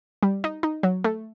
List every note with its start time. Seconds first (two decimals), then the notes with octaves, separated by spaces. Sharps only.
0.23 G3
0.44 D#4
0.63 D#4
0.83 F#3
1.04 A3